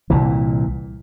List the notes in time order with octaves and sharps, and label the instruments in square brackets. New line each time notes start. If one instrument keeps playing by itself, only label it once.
[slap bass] C2 A#2 E3